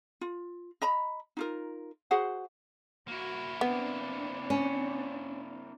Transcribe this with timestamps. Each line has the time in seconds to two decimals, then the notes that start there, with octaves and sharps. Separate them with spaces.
0.21 F4
0.82 D#5 A#5 B5
1.37 D#4 F4 A#4
2.11 F#4 G#4 C5 F#5
3.08 A#3 E4 F#4
3.61 B3 C4 D4
4.50 C#4